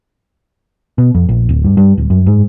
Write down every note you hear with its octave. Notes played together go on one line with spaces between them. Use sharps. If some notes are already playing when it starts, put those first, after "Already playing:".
B2
F2
A#1
D1
G2
G2
D1
F#2
G#2